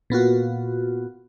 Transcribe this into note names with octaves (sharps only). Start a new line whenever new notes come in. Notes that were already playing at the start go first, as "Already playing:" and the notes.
A#2 B3 F4 F#4